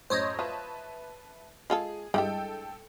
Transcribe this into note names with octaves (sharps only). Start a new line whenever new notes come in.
F#2 A2 C5 C#5 D#5
F4 B4 E5 A5
G#3 F4 G#4 A4
G2 G#3 E4 G4 A4 G5